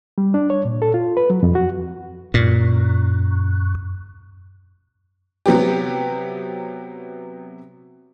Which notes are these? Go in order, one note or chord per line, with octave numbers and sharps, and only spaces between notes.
G3
D4
C#5
A#2
A4
F4
B4
F#3
F2
F#4
F#2 A#2
C3 F#3 B3 G4